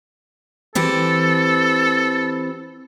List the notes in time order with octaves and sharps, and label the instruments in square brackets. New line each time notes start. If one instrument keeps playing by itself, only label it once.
[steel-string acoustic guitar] E3 C4 G4 [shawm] A4